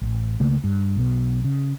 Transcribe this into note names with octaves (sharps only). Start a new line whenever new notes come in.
A1
C#2 C#3 A3 A#3
G2
B1 B2
C#3